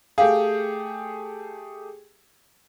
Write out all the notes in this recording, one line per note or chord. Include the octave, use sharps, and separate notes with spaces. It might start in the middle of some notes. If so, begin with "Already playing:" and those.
A3 G4 G#4 F5